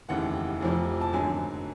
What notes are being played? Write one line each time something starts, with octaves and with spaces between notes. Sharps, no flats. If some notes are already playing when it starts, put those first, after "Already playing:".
F1 D#2 C#3 E3 F#5
F1 F2 C3 F3
A5
G#1 F#2 D3 F#3 G#5